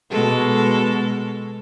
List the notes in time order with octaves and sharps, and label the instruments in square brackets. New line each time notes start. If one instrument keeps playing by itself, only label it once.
[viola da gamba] B2 G#3 A4